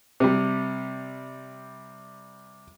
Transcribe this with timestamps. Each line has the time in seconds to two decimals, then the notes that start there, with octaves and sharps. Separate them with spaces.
0.20 C3 G3